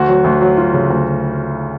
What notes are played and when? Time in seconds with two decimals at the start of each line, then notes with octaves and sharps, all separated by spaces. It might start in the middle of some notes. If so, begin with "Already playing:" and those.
Already playing: D2 F#4
0.08 F#3
0.24 D2
0.41 F#3
0.57 F#3 F4
0.74 C#3
0.90 D2